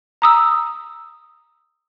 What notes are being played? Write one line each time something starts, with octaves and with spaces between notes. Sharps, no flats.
A#5 D#6 E6